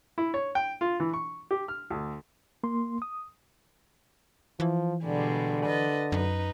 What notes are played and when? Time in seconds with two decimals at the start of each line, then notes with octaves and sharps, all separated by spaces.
0.18 E4
0.34 C#5
0.55 G5
0.81 F4
1.00 E3
1.14 C#6
1.51 G4
1.68 F6
1.90 D2
2.64 A#3 C6
3.02 D#6
4.60 E3 F3
5.04 B2 D3 G3 G#3
5.65 B4 D#5 A6
6.12 F#2 D#4 B4